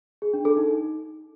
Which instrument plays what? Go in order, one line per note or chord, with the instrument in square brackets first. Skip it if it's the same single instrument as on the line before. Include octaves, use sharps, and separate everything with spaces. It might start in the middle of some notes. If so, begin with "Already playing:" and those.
[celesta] G#4
D4
A4
D#4